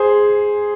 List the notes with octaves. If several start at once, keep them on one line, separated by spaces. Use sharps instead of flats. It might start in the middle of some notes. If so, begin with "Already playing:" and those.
Already playing: G#4 C5